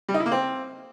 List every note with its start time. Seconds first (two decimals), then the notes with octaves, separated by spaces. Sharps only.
0.09 G3
0.14 D#4
0.20 E4
0.26 A#3
0.32 C4